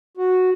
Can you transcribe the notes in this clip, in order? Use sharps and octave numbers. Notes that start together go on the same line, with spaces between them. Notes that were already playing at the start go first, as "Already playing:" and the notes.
F#4